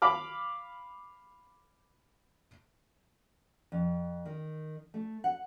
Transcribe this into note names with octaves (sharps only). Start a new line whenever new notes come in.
F5 B5 D6 F6
F2
D#3
A3
F#5